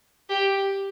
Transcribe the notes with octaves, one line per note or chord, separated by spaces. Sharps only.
G4